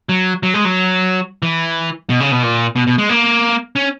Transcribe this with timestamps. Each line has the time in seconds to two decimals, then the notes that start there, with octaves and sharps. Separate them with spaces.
0.09 F#3
0.43 F#3
0.54 G#3
0.65 F#3
1.43 E3
2.09 B2
2.20 C#3
2.31 B2
2.43 A#2
2.76 B2
2.87 B2
2.98 G#3
3.09 A#3
3.76 C#4